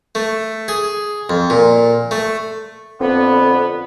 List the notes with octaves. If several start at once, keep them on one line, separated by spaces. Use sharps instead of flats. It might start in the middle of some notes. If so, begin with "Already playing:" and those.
A3
G#4
F2
A#2
A3
F2 D3 B3 C4